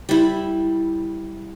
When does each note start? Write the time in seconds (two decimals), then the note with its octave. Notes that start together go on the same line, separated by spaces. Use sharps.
0.09 G3 E4